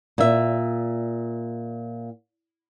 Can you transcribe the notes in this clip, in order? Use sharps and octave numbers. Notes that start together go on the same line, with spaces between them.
A#2 E5